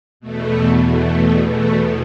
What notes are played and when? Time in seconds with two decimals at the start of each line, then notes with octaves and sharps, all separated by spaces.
0.20 E2 B2 A3
0.86 A3
1.51 A3